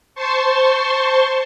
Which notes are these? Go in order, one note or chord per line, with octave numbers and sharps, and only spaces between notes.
C5 A5 C6 C#6